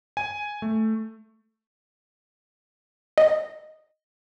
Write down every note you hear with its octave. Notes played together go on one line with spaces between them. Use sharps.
G#5
A3
D#5